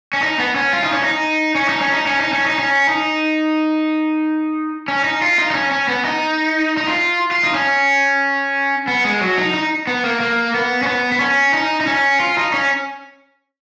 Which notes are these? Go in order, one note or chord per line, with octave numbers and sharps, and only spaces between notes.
C#4
D#4
B3
C#4
F4
D#4
C#4
D#4
C#4
D#4
C#4
D#4
C#4
D#4
C#4
D#4
C#4
D#4
C#4
D#4
F4
D#4
D#4
C#4
C#4
B3
D#4
D#4
F4
F4
D#4
C#4
B3
G#3
F#3
D#4
D#4
B3
A#3
A#3
B3
C#4
B3
B3
C#4
D#4
D#4
C#4
F4
D#4
C#4